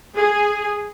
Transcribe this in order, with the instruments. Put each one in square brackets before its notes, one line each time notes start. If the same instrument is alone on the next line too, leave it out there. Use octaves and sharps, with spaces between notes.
[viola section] G#4